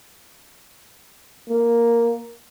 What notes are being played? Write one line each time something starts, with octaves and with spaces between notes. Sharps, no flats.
A#3